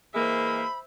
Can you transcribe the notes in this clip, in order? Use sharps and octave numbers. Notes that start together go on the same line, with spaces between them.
E3 G#3 A#3 C5 E5 B5